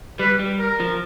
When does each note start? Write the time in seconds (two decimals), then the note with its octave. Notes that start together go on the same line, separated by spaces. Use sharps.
0.19 G3 B4
0.39 G3
0.59 A#4
0.80 F3